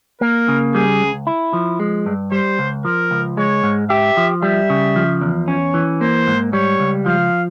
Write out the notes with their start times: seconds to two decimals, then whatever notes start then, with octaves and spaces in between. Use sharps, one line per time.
0.21 A#3 A#4
0.48 C#3
0.74 G3 G#4
1.01 C#2
1.27 E4
1.53 F3
1.80 G#3
2.06 G2
2.32 G3 C5
2.59 C#2
2.85 F3 A#4
3.11 C#2
3.37 G#3 C#5
3.63 G#2
3.90 G4 E5
4.17 F3
4.43 G3 E5
4.70 C#3
4.96 F3
5.21 E2
5.48 C#4 C#5
5.74 E3
6.01 A#3 C5
6.27 G#2
6.53 G3 C#5
6.80 C#2
7.06 F3 F5